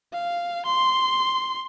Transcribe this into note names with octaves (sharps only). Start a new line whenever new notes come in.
F5
C6